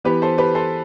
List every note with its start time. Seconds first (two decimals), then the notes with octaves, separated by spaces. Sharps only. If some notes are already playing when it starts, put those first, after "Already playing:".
0.04 E3 B3 G4 B4
0.22 A4 C5
0.38 G4 B4
0.55 A4 C5